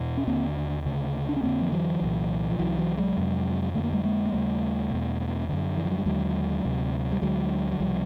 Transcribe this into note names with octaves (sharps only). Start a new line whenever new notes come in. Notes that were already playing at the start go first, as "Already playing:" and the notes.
Already playing: E2 B2
C#4
D#2 D3 A#3 C4
D2 C#3
D4
C#4
F2 D3 A#3 C4
F3
E3 F#3
C2 A#2
F3
C2 C3 E3 F#3
E3 F#3
F#3 G#3
F2 C3
F2 D3 A3
A#3
G3 A3
G#3 A#3
A#3
D#2 C#3 G3 A3
E2 B2
F#2 D3
E3
F3
F#3
G3
D#2 D3 F#3 G#3
D2 C3
G3
D2 D3 F#3 G#3
F#3
C#2 C3 F3 G3